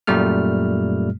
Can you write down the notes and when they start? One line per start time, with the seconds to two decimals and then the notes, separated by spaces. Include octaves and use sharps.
0.07 F#2 A#2 G3 A3 F6